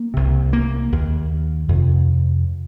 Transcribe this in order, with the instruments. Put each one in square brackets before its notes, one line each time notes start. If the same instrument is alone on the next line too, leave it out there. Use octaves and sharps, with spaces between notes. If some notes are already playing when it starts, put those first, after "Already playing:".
Already playing: [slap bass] A#3
C2 C3
A#3
D#2
F2 C3